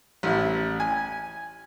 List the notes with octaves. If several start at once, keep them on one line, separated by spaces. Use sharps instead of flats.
A1 E4
G#5